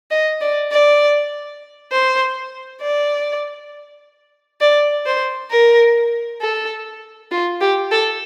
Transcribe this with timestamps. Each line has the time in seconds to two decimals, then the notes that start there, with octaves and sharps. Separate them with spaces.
0.11 D#5
0.41 D5
0.71 D5
1.92 C5
2.82 D5
4.61 D5
5.06 C5
5.51 A#4
6.41 A4
7.32 F4
7.61 G4
7.92 A4